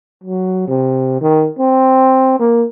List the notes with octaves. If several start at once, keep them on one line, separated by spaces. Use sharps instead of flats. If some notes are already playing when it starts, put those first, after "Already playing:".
F#3
C3
D#3
C4
A#3